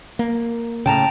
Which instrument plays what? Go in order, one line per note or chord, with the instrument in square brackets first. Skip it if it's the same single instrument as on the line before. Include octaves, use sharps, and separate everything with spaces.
[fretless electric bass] A#3
[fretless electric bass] A2 C#3 [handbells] G5 A5 A#5